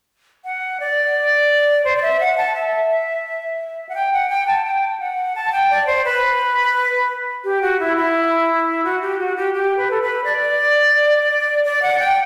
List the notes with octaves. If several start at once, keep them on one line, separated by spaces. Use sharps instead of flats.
F#5
D5
C5
D5
E5
F#5
A5
E5
F#5
G5
F#5
G5
A5
G5
F#5
A5
G5
D5
C5
B4
G4
F#4
E4
E4
F#4
G4
F#4
G4
G4
B4
A4
B4
D5
D5
F#5
G5